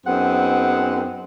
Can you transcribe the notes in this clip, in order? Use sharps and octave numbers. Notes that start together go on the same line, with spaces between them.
F#2 B3 C4 D#4 G#4 F#5